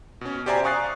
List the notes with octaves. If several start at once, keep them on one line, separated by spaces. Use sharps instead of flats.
B2 C#4
G4 C5 D5 E5 G#5 A#5
F5 C#6 D#6 F#6 A6 C7